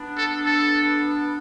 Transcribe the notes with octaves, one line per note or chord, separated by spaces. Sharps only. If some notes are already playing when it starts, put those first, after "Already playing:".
Already playing: B3 D4
A4
A4